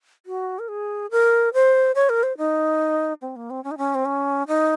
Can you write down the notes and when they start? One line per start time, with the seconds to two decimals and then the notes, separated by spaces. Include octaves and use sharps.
0.26 F#4
0.59 A#4
0.68 G#4
1.11 A#4
1.54 C5
1.95 C#5
2.09 A#4
2.23 C5
2.38 D#4
3.22 C4
3.36 A#3
3.50 C4
3.64 C#4
3.71 D#4
3.78 C#4
3.95 C4
4.05 C#4
4.48 D#4